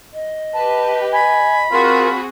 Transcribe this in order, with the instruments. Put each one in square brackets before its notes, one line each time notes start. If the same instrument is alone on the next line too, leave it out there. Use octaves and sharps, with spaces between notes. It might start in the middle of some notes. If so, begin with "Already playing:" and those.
[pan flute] D#5
[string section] G4 B4 [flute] A5
[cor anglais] G#5 [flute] B5
[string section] C4 F#4 G#4 [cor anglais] F4 [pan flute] A#4